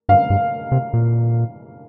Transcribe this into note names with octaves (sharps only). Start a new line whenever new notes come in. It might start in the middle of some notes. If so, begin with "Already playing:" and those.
G2 F5
G2
C3
A#2